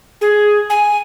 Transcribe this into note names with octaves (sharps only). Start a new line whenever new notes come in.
G#4
G#5